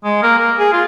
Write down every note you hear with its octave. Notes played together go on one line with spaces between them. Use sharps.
G#3
A#3
A#3
G#4
F4